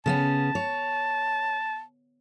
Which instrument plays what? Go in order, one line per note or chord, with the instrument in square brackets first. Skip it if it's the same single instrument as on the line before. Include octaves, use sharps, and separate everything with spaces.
[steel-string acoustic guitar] C#3 B3 C#4 [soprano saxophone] A5
[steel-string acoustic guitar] C#5